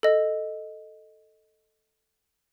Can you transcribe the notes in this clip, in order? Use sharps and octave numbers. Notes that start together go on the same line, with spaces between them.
A4 D#5